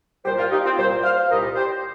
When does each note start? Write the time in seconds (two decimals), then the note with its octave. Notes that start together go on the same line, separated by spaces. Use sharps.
0.25 C2 A#2 G3 G4 C5
0.38 F4 A#4
0.51 D#4 G4
0.64 C4 F4
0.77 C2 A#2 G3 G4 C5
1.03 C5 F5
1.29 C2 A#2 G3 A#4 D#5
1.55 G4 C5